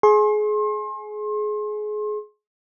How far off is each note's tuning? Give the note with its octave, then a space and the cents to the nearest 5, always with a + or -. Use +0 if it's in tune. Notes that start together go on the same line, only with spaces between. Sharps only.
G#4 +25 C6 +35